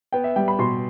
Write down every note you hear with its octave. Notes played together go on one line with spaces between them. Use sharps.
B3 G5
E5
G3 G5
B5
B2 C6